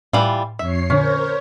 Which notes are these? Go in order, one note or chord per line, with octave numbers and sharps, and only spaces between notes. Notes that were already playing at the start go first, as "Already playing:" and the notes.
A2 E3 G3 F4
F2 C#5 E5 C7
A#2 D3 C#4 A#4 C5 C#5